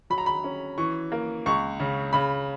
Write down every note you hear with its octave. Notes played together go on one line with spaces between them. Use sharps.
F#3 B5
A#5
B5
C#4
E3 C#6
A#3
C#2 C#6
C#3
C#3 B5